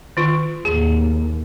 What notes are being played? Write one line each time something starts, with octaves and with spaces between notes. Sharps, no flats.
D#3 F4
D#2 A2 G#4